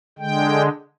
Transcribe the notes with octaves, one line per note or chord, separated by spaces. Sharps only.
D3 G#3 G5